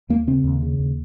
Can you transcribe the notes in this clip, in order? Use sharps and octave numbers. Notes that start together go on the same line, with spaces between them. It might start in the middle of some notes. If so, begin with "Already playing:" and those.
D#2 A#3
C#3 C4
D#2
C#3
D#2